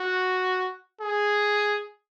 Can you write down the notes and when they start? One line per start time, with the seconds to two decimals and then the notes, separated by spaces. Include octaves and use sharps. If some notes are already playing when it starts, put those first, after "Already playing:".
Already playing: F#4
1.00 G#4